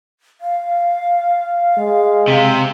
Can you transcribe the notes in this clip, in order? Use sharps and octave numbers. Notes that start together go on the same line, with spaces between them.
F5
G#3
C3